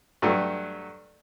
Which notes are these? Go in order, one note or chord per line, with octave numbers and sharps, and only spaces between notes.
G2 F#3 A3